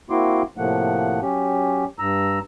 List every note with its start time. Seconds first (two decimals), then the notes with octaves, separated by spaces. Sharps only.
0.10 A#3 C4 E4 F#4 C6 D6
0.58 A2 C3 F3 A3 A#3 F#5
1.22 F#3 C#4 G4
1.99 G2 A#5 E6